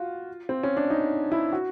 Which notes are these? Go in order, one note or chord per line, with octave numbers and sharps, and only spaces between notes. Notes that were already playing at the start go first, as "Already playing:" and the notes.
Already playing: F4 F#4
C4
C#4
D4
D#4
E4
F#4